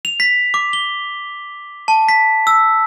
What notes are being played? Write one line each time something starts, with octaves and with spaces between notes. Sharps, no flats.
F7
B6
D6
G7
A5
B6
E6